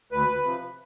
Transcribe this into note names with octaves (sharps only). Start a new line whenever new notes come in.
D2 B4
C3 F3